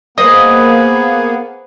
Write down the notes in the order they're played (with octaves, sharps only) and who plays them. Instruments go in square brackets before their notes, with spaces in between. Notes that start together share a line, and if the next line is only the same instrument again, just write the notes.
[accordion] A#3 B3 [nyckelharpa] G#4 B4 [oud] C5 D#5 [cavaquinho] D#6